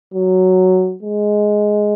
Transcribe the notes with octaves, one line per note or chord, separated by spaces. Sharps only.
F#3
G#3